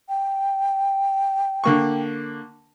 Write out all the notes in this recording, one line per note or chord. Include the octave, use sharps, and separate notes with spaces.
G5
D3 A#3 C#6